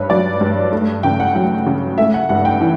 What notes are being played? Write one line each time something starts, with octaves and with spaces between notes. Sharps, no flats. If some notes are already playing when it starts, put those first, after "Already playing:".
Already playing: G2 B4 C#5
F#3 D5
G2
A3
C#3 G5
F#5
F#3 F#5
C#3
A3 E5
F#5
G2 F#5
G5
E3